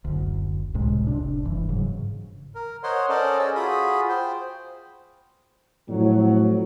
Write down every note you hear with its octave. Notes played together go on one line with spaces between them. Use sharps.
F#1 D2
C#2 A2 C3 G#3
F1 C2 C3 D4
F1 G2 E3
G#2 C#3 F#3
A#4
A#4 C5 C#5 D#5 F#5 C6
C#4 A4 A#4 C5 D5 D#5
G#4 D#5 G#5 E6
F4 F#4 G#4 B5 D#6
C5 G5
F2 A2 F#3